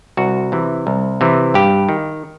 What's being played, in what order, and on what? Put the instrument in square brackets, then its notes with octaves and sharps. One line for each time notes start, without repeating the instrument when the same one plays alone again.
[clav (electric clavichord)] C2 F#4
C3 E3
C2
C3 E3
G2 G4
D#3